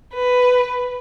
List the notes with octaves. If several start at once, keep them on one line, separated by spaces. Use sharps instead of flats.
B4